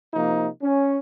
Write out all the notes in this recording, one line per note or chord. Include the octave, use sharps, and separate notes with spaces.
C3 F3 A#3 D#4
C#4